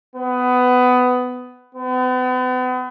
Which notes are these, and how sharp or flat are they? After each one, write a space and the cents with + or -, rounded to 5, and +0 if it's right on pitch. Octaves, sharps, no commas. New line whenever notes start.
B3 +20
B3 +40